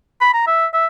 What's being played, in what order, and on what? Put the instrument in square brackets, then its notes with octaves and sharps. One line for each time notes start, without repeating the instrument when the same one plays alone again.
[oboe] B5
A#5
E5
E5